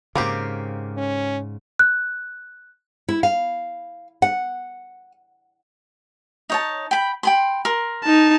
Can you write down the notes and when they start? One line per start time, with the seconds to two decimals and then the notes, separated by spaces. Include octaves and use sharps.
0.15 G#2 C#3 A#3 C4 G4
0.97 C#4
1.79 F#6
3.09 E4
3.23 F5
4.22 F#5
6.50 D#4 C#5 A5
6.91 G5 B5
7.23 G5 B5 C6
7.65 A#4 C6
8.04 D#4 A5